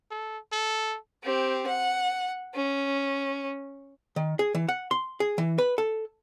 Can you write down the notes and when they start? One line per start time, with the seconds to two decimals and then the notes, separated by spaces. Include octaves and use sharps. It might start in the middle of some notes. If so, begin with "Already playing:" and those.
0.11 A4
0.52 A4
1.23 C4 G4
1.67 F#5
2.54 C#4
4.16 D#3
4.39 G#4
4.55 E3
4.69 F#5
4.91 C6
5.20 G#4
5.38 E3
5.58 B4
5.78 A4